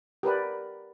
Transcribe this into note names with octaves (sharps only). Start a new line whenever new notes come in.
G4 A#4 B4 D5